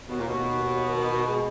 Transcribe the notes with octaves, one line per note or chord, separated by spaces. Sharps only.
D#2 B2
A#2
B2
D#2
D#3
G#3